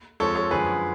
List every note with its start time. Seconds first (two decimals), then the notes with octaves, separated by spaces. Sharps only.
0.20 F2 F3 G#3 A4 C#5
0.35 A4 C#5
0.51 F#2 D3 F3 G#3 G#4 B4